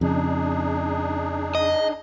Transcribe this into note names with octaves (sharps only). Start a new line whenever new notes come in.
F2 C#3 D4 D#4 G#4
D#5